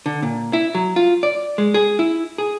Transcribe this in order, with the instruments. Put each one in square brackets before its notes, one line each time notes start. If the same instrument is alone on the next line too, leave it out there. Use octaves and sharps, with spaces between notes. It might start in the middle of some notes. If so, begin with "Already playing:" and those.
[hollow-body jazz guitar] D3
A#2
E4
F#3
F4
D5
G#3
G#4
E4
G#4